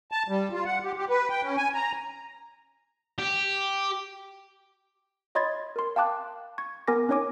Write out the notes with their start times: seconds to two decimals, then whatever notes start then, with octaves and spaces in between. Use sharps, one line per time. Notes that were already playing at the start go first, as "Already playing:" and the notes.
0.12 A5
0.29 G3
0.53 F4
0.66 F#5
0.84 G4
0.97 G4
1.10 B4
1.29 G5
1.43 C#4
1.57 G#5
1.74 A#5
3.19 G4
5.35 C#5 D#5 B5 C6 G#6 A6
5.76 A#4 C6
5.96 F5 G5 A5 D6 F#6
6.58 C#6 G#6
6.88 B3 A#4 G#5 D6 A#6
7.08 C4 C#4 D#4 C#5 G#5 D6